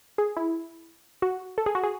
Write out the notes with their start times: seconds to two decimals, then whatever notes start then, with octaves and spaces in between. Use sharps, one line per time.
0.18 G#4
0.37 E4
1.22 F#4
1.58 A4
1.66 G#4
1.75 F#4
1.83 G#4